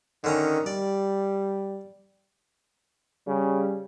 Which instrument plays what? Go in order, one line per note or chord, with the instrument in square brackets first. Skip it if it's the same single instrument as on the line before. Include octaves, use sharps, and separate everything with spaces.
[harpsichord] D3 C#4 A#5 [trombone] D#3
[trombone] G3 [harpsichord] D5
[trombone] C#3 [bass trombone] G3